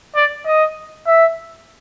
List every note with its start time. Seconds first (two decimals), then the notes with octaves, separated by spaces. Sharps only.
0.16 D5
0.46 D#5
1.07 E5